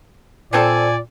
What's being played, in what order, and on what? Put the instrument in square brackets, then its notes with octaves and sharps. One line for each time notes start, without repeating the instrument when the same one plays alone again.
[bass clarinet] A#2 [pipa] F3 C4 A4 [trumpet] D5 [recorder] G#5